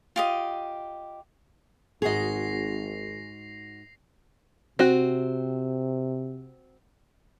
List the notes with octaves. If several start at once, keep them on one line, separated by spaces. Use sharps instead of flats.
F4 G4 D#5
G#1 G#2 F#4 G#4 D#5 A#6 C7 F7
C3 C4 F#4